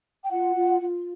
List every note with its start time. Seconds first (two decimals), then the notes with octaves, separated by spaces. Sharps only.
0.24 G5
0.31 F4 F#5
0.56 F4
0.81 F4